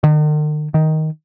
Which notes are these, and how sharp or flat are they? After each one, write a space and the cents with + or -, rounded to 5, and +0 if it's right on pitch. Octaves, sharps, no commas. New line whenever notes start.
D#3 -45
D#3 +10